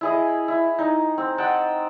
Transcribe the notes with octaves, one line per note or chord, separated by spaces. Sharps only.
E4 G#4 D#5
E4
D#4
C4
D#5 F#5 G5 A5